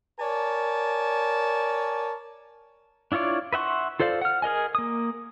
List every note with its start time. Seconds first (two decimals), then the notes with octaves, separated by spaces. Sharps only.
0.19 A#4 C#5 D5 G#5 A5
3.12 D4 E4 F4 C#5 D5
3.53 B4 E5 F#5 C6 C#6
4.00 F4 A4 C5 D5 F5
4.21 F#5 F6
4.42 G#4 A#4 D#5 G#5
4.75 A#3 D#6